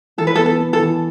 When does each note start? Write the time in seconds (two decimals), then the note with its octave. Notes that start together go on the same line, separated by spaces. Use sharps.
0.18 E3 A4
0.27 B4
0.35 A4
0.38 B3
0.46 A4
0.59 B3
0.73 A4
0.79 E3